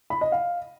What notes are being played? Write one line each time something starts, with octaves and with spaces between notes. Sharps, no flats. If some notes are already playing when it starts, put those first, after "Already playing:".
B5
D#5
F5